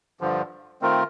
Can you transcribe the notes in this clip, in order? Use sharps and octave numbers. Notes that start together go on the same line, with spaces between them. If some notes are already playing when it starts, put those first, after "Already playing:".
G2 D3 F3
D#3 A3 C4 F4 A#4